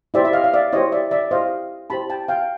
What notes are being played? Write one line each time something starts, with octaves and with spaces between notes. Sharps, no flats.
E4 G4 C5 D5 E5
E5
D#5 F5
F5
D5 E5
E4 G4 C5 C#5 D#5
D5 E5
D5 E5
E4 G4 C5 D#5 F5
E4 G4 C5 A5 B5
G5 A5
F5 G5